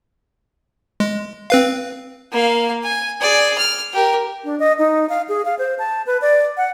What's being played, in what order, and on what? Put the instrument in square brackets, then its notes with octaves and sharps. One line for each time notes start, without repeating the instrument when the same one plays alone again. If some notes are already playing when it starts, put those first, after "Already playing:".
[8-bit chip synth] G#3
C4 B4 F5
[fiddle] A#3 F5
G#5
G#4 D5
F6
G4 A#4
[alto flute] D4
D#5
D#4
F5
G#4
F5
C5
A5
B4
D5
F#5